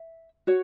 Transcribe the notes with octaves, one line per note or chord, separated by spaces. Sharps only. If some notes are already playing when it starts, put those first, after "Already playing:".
Already playing: E5
F#4 C#5